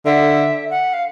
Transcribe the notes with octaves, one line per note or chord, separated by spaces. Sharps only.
D3 E5
F#5
F5